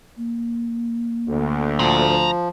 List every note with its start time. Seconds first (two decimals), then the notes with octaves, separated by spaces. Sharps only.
0.17 A#3
1.29 D2
1.79 F3 A#5 C6